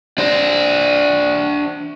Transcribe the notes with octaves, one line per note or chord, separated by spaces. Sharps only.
D4 C5